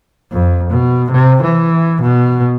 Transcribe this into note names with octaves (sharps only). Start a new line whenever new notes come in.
F2
B2
C3
E3
B2